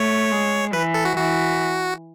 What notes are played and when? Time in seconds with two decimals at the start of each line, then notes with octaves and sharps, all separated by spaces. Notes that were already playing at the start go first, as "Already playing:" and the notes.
Already playing: A3 C#5
0.31 G#3
0.73 E3 B4
0.94 A4
1.05 F#4
1.16 E3 F#4